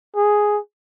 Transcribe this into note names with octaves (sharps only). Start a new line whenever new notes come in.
G#4